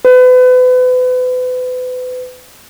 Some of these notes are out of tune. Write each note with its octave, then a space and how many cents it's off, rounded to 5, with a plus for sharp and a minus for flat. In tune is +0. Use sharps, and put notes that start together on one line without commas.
B4 +35